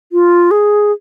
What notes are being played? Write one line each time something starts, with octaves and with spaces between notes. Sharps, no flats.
F4
G#4